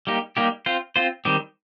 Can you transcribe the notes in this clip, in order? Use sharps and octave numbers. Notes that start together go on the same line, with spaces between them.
G3 A#3 D#4 G4
G3 A#3 D#4 G4
C4 F4 C5
C4 F4 C5
D#3 G3 C4 G4